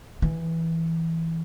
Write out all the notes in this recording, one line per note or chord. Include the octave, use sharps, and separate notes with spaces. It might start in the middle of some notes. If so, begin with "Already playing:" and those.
E3